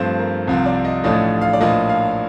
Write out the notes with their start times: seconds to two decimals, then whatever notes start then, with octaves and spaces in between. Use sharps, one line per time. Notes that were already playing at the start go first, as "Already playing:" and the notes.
Already playing: G2 F3 A3 C4 C5
0.19 A#4
0.47 C2 C3 F3 C4
0.66 D5
0.85 D#5
1.04 A1 A2 F3 A3 D4 D#5
1.41 F5
1.53 D5
1.60 A#1 A2 F3 A#3 D4 D#5
1.89 F5